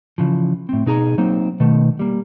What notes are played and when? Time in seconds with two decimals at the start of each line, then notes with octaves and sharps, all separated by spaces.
0.18 C#3 E3 F3
0.69 A2 C4
0.86 B2 D#4 G#4 A#5
1.18 F#3 A#3 C4 D#4
1.60 B2 D#3 A3
1.99 G3 A#3